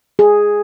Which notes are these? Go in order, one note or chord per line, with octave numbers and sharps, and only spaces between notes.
G#4